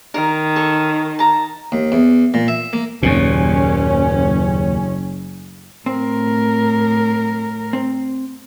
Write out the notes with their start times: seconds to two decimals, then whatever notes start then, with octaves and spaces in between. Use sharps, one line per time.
0.14 D#3 A#4
0.56 A4 C#5
1.19 A5 A#5
1.72 D#2
1.92 E2
2.34 A#2
2.48 E5
2.73 A#3
3.03 F#1 D#2 A#2 C#4
5.86 A2 C4 A#4
7.73 C4